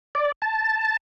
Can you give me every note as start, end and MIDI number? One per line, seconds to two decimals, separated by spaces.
0.15 0.32 74
0.42 0.97 81